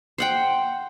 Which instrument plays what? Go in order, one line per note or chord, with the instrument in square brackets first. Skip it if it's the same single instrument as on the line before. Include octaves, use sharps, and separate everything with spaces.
[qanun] C5 F#5 G5